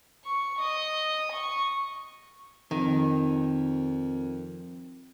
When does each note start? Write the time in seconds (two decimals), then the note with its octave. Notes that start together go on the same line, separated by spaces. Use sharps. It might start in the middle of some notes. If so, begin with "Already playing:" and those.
0.25 C#6
0.59 D#5
1.32 C#6
2.71 F2 D#3